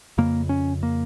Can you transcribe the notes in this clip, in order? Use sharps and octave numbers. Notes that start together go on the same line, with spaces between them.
F2 C#3 A#3
C#4
A#3